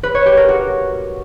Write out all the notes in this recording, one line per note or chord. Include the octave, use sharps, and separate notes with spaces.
B4
C#5
G4
A#4
F#4